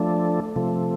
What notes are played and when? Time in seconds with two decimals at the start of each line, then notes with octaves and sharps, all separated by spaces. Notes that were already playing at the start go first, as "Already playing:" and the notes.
Already playing: F3 A3 D4
0.56 C3 F3 A3